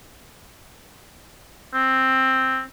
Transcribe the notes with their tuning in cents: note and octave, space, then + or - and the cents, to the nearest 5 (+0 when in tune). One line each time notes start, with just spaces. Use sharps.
C4 +5